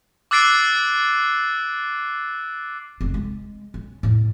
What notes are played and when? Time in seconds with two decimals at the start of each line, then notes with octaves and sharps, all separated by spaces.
0.31 D6 E6 F#6 A6 C7 D7
3.01 F1 C4
3.14 G#3
3.74 C#4
4.03 F2 A2